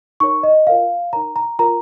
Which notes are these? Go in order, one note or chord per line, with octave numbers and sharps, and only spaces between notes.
D#4 A#4 C#5 C#6
D#5
F4 A#4 C#5 F5
D#4 A#4 C#5 A#5
A#5
F4 A#4 C#5 A#5